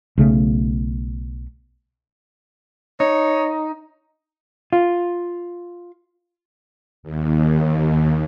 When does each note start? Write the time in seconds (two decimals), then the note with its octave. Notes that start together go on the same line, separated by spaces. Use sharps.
0.18 B1 C#3 A3
3.00 D#4 C#5
4.73 F4
7.03 D#2